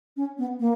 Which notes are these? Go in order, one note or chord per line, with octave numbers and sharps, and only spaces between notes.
C#4
B3
A#3